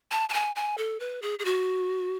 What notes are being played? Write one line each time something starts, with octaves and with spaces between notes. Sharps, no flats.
A5
A5
G#5
G#5
A4
B4
G#4
G#4
F#4